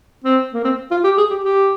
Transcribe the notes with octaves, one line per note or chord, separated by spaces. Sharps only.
C4
A#3
C4
F4
G4
G#4
G4
G4